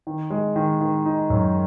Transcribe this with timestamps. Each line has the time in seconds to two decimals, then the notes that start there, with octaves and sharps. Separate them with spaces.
0.07 D#3
0.30 G#3
0.56 D#3
0.81 D#3
1.05 D#4
1.30 F#2